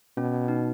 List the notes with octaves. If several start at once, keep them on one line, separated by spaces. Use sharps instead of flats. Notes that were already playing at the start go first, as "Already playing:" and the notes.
B2 C#4
D#4